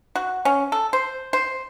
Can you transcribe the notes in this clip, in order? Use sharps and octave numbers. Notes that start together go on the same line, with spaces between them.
F#4
C#4
A4
C5
C5